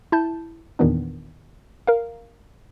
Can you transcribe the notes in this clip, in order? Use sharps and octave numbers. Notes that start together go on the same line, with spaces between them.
E4 A5 G6
E2 A#2 D#3 E3 B3 D4
A#4 F5